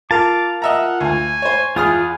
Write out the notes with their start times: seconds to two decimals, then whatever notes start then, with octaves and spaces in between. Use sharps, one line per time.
0.11 F4 A#4 F5 A5 D6
0.62 D#5 E5 F#5 A#5
1.00 D2 G#5
1.42 C5 C#5
1.76 E2 F4 G#4 G#5 D#6 F6